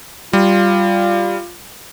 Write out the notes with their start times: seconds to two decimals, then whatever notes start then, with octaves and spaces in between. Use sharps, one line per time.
0.33 G3 F4